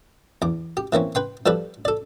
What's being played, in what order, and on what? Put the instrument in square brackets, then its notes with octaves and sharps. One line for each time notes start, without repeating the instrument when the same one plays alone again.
[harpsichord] E2 D6
G4
E3 A#3 C4 C#4
B4 G5 C6
F3 G3 A4 B4 D5
A4 D5